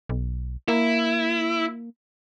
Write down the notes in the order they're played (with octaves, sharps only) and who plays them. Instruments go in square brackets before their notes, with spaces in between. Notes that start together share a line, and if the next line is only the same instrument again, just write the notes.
[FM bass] B1
[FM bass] A#3 [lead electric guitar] E4